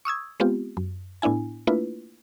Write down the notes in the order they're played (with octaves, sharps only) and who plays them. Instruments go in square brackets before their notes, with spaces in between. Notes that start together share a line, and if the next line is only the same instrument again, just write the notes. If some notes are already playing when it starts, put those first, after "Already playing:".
[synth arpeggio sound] C#6 D#6 E6 G#6
G#3 B3 C4 F4 G4
F#2
A2 B3 D4 E4 G#5
A3 A#3 D4 E4 F4 B4